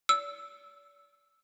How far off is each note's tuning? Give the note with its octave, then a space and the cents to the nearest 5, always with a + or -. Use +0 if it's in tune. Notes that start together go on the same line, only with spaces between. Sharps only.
D5 -40 E6 +0